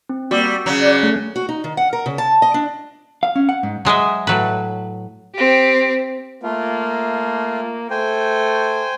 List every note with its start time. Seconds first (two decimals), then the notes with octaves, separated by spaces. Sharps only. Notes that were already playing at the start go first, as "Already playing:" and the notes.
0.09 C4
0.31 G3 A#3 F#4 D6 E6
0.66 C#3 F#3 C#4
0.80 D5 F#6
1.03 A3
1.36 F#4
1.49 D#4
1.64 D#3
1.77 F#5
1.93 A#4
2.06 C#3
2.18 A5
2.42 D#5
2.54 D4
3.23 F5
3.36 C#4
3.49 F#5
3.63 G#2
3.85 F#3 G#3 D#5 E5
4.27 A2 F#3 B4
5.35 C4 G4
6.43 A3 A#3 F4
7.90 A3 C5 G5 G#5